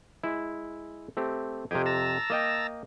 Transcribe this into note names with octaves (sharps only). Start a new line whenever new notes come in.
G#3 E4
A3 C4 G4
F2 C3 G4 G#4
A5 A#5 E6
A#3 D#5 G5